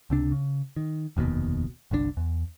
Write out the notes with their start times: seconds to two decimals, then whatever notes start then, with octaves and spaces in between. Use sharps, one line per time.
0.10 C#2 C3 D4
0.32 C#3
0.76 D#3
1.17 F1 D#2 G#2 B2
1.91 G1 C2 A#2 D4
2.17 E2